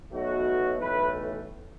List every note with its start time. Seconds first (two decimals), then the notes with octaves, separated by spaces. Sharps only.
0.12 B1 B2 F#3 A3 F#4
0.79 B1 A2 E3 A3 B4